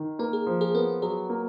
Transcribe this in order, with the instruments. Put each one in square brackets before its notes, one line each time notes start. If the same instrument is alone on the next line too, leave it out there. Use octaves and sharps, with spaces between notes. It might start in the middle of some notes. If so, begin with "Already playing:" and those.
Already playing: [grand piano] D#3
[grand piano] A#3 [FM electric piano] B4
[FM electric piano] G#4
[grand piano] F3
[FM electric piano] G#4
[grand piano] B3 [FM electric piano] A#4
[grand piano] F#3 [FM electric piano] G#4
[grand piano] A#3